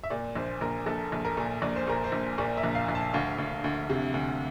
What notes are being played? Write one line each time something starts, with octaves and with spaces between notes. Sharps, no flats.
E5
A#2 D5
A#1 C5
A#1 A#4
A#1 A4
A#1
A#4
A#2
A#1 D5
C5
A#2 A#4
C5
A#1
A#2 D5
E5
A#1
F5
A#1
A5
D2 F5
D2
D2
C3
D2